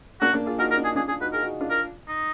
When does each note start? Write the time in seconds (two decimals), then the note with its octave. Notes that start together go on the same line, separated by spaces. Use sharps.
0.21 A#3 D4 F#4
0.33 A#3 D4
0.46 F4 G#4
0.58 D#4 F#4 A#4
0.71 A#4
0.77 D4 F4
0.84 G#4
0.96 D4 F4 G#4
1.08 D4 F4 G#4
1.20 D#4 F#4 B4
1.33 F4 G#4 A#4
1.42 D#4 F#4
1.61 D4 F4
1.70 A#4
2.08 D#4